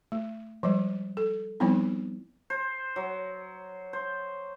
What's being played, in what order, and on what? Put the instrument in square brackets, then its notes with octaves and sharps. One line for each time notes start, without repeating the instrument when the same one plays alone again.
[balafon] A3
F3 G3 G#3
A4
F3 G3 B3 C4 D#4 E4
[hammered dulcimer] C5
F#3
C5